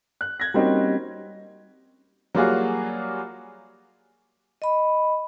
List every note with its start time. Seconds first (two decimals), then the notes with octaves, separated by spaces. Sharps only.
0.21 F#6
0.40 G#6 A#6
0.54 G3 A#3 C4 C#4 D#4 F#4
2.35 F#3 G3 A#3 F4 F#4 G#4
4.62 D#5 B5